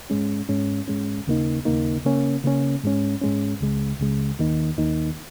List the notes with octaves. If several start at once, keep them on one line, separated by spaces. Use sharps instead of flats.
G#2 G#3 C#4
G#2 G#3 C#4
G#2 G#3 C#4
D#2 C#3 A#3 D#4
D#2 C#3 A#3 D#4
C#3 A#3 C#4
C#3 A#3 C#4
G#2 G#3 C#4
G#2 G#3 C#4
C#2 C#3 G#3
C#2 C#3 G#3
D#2 D#3 A#3 D#4
D#2 D#3 A#3 D#4